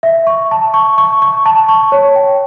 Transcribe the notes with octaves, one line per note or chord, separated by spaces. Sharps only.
E5
C#6
A5
C#6
C#6
C#6
A5
C#6
C#5
G5